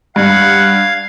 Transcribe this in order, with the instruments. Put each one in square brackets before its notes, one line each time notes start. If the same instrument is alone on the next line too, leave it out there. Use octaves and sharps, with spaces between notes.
[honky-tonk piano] G2 [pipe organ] F5 G#6 [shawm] F#5